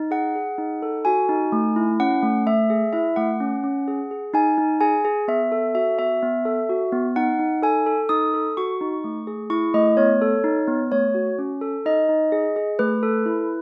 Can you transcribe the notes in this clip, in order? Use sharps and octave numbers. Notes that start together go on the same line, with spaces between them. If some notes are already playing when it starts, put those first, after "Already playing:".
Already playing: D#4
G#4 F#5
G#4
D#4
A4
F#4 G#5
D#4
A3
E4
C#4 F#5
A3
A3 E5
G#4
E4 E5
A3 F#5
C#4
C#4
G#4
G#4
D#4 G#5
D#4
G#4 G#5
G#4
B3 E5
A4
F#4 E5
B3 E5
B3
A4
F#4
B3
D#4 F#5
D#4
A4 G#5
A4
D#4 D#6
A4
F#4 C#6
D#4
A3
G#4
E4 C#6
A3 D#5
B3 C#5
A4
D#4
B3
A3 C#5
F#4
C#4
A4
D#4 D#5
D#4
G#4
G#4
A3 B4
A4
E4